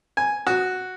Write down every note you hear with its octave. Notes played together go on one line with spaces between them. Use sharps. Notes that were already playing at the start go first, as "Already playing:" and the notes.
G#5
F#4